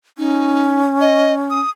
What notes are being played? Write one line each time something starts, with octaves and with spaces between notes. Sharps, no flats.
C#4 D#4
D#5
D#6